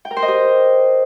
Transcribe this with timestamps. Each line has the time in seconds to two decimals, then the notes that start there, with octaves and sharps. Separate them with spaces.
0.05 G5
0.11 A#4
0.17 C5
0.22 D#5
0.28 G4